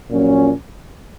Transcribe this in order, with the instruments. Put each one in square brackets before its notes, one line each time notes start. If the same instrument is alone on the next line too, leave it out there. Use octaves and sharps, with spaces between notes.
[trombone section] A#1 A#2 F#3 C#4